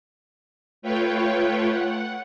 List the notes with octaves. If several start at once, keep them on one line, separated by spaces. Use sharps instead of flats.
A3 F4 B4 C#5 G5
F#5